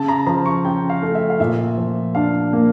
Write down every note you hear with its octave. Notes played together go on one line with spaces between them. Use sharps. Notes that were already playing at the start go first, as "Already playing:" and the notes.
Already playing: C#3 A5
A#5
F3 A#5
C#6
C#4 G5
F5
A3
E5
F5
A#2 E5
F3
D4 F5
A#3